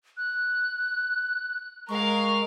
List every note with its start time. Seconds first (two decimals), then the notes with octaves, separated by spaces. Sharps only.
0.17 F#6
1.89 G#3 A#4 F5 C#6